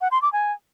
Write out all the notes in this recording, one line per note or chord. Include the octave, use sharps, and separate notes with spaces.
F#5
C6
D6
G#5